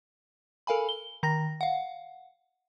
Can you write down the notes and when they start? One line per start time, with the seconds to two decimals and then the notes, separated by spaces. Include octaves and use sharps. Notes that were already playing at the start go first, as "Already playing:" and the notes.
0.67 A4 A#4 F5 G#5 B5
0.89 G7
1.23 D#3 A#5 A#6
1.61 F5 F#5